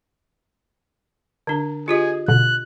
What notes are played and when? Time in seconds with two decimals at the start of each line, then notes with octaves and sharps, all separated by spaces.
1.47 D3 D4
1.88 F4 G4 G#4 D#5
2.28 B2 D3 F#6